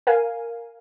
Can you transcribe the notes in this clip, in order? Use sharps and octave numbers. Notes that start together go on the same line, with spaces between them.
A#4 F5 G#5